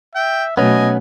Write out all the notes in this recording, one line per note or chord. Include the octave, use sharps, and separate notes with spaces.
E5 G5
B2 F#3 A3 B3 C#4 D#5 G#5